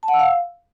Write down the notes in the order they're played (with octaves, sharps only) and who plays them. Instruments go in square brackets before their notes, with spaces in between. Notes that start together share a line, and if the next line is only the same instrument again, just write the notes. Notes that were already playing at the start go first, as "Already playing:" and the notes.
[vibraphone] A5
F#5
E6
F5